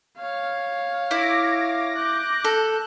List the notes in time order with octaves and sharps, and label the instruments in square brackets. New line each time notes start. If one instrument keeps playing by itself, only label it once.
[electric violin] C#5 F5
[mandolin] E4 [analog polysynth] D6 A#6
[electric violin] F#6 G6
[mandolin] A4